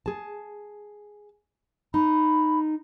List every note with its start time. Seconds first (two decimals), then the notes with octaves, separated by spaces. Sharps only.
0.06 G#4 A5
1.94 D#4 B5